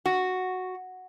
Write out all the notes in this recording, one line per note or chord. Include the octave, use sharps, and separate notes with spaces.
F#4